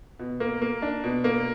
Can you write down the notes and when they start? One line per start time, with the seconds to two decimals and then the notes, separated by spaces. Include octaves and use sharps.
0.19 B2
0.40 A#3
0.62 A#3
0.82 D4
1.04 B2
1.24 A#3